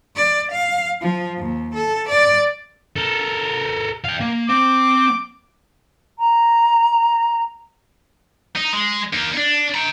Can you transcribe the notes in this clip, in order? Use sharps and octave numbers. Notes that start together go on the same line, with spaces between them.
D5
F5
F3
D#2
A4
D5
A4 A#4
F5 G5
A#3
C4 D6
A#5
D#4
G#3
A#3 D#4
D4
G5 A#5